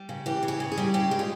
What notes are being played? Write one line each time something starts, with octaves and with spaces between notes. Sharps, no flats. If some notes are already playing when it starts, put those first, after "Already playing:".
Already playing: G3
C#3
E3 G4
C#3
G#4
C#3
G#4
G3
C#3 G4
G#3
F4